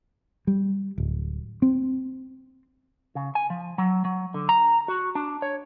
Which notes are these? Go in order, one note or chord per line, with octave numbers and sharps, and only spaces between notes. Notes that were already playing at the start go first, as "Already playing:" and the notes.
G3
D1
C4
C#3
G#5
F3
F#3
F#3
D3
A#5
F#4
D4
C#5